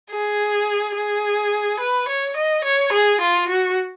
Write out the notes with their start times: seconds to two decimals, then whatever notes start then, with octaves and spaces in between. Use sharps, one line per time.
0.11 G#4
0.95 G#4
1.80 B4
2.09 C#5
2.37 D#5
2.65 C#5
2.93 G#4
3.21 F4
3.49 F#4